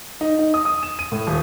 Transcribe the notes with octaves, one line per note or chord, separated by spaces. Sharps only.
D#4
D#4
D#6
D#6
E7
D#7
A2
D#1